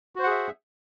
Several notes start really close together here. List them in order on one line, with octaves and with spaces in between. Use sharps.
F#4 C5 F#5 G#4 E5